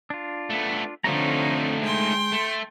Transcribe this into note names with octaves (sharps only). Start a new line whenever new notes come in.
D4 F4
A3 B3
D3 F3 A3 C4 D#4 C#5 A#5
G#3 G5 C6
A3